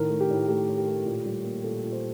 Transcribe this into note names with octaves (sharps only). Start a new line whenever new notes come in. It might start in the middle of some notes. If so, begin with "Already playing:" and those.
Already playing: A2 D#3 A#4
A3
G4
A2
A3 G4
A2
G4
A3
A#2
G3
A#3
A#2 A4
A#2
C5